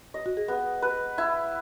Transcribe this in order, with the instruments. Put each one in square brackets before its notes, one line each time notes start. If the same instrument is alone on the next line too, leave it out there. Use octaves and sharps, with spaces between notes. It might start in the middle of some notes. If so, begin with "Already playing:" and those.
[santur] D#5
[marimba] F#4
G#4
[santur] B3
B4
E4